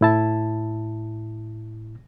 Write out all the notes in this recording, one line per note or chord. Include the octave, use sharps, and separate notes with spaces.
A2 E4 A5